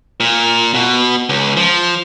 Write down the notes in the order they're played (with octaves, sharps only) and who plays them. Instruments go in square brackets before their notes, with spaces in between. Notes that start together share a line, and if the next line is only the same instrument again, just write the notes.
[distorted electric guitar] A#2
B2
C#2
F3